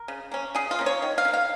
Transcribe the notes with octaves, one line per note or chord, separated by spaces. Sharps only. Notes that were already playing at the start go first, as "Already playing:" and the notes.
Already playing: A#4
C#3
A#3 C#4
C#3 G#4
F4
A#3 C#4
C#5
D#3
F5
C#4
A#3
F5